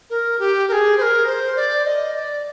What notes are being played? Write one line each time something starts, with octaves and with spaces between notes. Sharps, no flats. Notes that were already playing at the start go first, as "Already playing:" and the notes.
A#4
G4
A#4
G#4
C5
A#4
C5
D5
D#5
D5